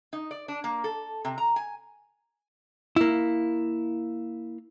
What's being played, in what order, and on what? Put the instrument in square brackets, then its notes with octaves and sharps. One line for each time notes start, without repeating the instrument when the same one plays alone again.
[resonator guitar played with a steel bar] D#4
D5
D4
A#3
A4
C3
A#5
G#5
[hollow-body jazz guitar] A#3 E4